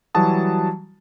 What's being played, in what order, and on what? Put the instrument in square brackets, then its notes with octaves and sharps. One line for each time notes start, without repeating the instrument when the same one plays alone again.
[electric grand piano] E3 F#3 G3 F#4 A5 D#6